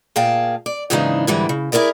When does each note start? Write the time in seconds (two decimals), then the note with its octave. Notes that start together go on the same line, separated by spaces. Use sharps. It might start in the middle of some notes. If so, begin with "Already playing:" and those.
0.16 A#2 G#4 F5 G5 A5
0.66 D5
0.90 D#2 G#2 C#3 E3 D4 D#4
1.27 G#2 D3 E3 G3
1.49 C#3
1.72 E4 G#4 A#4 D5 D#5